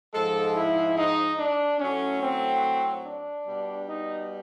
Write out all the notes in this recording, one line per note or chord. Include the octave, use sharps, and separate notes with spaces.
G#2 F3 G#3 A4
E4
D#4
D4
A2 F#3 A3 C#4
C4
D4
B2 G3
D#4